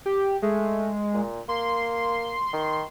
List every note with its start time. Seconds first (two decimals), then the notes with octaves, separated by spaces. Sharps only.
0.06 G4
0.42 G#3 A3
1.13 A#2
1.49 A#3 C6
2.53 D#3